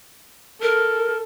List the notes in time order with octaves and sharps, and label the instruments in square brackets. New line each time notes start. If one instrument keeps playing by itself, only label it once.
[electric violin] A4 [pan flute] A#4